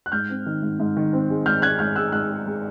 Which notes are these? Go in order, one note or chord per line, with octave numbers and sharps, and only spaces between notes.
F#6
G#2 F6 G6
C4
D#3
G#2
G#2
D#3
C4
G#3
G#2 F6 G6
C4 F#6 G#6
G#2 F6 G6
G#3 E6 F#6
G#2 E6 F#6
G#3
G#3